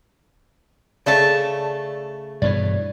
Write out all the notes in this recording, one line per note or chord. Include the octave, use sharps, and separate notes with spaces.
C#3 A3 D5 E5 A5
G2 B2 E3 C#5 D5